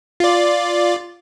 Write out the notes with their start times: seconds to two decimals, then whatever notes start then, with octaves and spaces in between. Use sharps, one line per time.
0.20 F4 D5